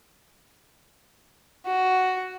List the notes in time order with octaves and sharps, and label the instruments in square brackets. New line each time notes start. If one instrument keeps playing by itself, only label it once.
[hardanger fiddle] F#4